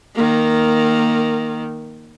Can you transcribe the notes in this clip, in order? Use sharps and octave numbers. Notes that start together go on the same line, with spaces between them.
D#3 A#3